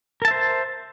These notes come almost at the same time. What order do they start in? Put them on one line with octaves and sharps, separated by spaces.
A#4 A5 E5 C5